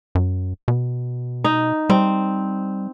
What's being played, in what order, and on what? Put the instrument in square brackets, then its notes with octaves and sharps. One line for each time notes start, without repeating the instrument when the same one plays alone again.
[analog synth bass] F#2
B2
[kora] D#4
[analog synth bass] G3 [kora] C4